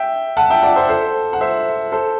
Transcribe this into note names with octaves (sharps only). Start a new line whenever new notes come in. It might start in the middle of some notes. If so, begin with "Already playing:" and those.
Already playing: E5 G5
F#5 A5
E5 G5
D5 F#5
C5 E5
A4 C5
F#5
C5 E5
A4 C5